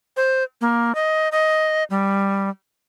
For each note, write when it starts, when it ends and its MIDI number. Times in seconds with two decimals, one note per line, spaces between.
0.17 0.44 72
0.61 0.95 58
0.95 1.29 75
1.32 1.84 75
1.90 2.50 55